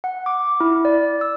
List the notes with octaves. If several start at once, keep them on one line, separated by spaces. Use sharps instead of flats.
F#5
D6
E4
D5
E6